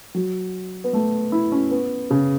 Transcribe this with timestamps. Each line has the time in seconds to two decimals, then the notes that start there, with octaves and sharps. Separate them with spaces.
0.14 F#3
0.84 B3
0.93 A3
1.32 E4
1.52 C#4
1.71 B3
2.11 C#3